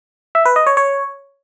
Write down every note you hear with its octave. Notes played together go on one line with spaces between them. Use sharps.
E5
B4
D#5
C#5
C#5